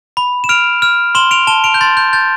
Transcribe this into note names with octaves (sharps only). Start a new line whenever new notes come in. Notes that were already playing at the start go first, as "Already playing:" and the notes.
B5
E7
F6 D7 F7
F6
C6 E7 G7
D7 F7
A5 E7 G7
D7 F7
G6
C6 A6
G6
G6 A6